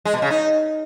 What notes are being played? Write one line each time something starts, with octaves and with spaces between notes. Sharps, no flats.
G#3
B2
C#3
D#4